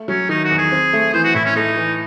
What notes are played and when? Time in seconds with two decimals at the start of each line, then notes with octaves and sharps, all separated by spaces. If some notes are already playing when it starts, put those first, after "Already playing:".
Already playing: A3
0.08 F#3 C#4
0.29 D#3 D#4
0.44 F#4
0.51 E2
0.58 G#4
0.72 C4
0.93 A3
1.14 E3 C5
1.24 F#4
1.34 A2 E4
1.45 C#4
1.56 A3 D#4
1.76 E3